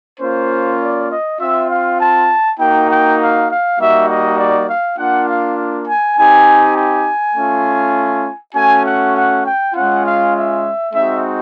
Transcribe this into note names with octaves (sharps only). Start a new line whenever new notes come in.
A#3 C#4 F4 C5
D5
D#5
C4 F4 E5
F5
A5
A#3 D#4 F#4 G5
G5
F5
F5
G3 A#3 D#4 F#4 E5
D#5
D5
F5
A#3 D4 F4 F#5
F5
G#5
C4 D#4 G4 G#5
G#5
A3 C#4 F4
A3 C#4 F#4 G#5
F#5
F#5
G5
G#3 C#4 F4 F#5
F5
E5
G#3 C4 D#4 F#4 E5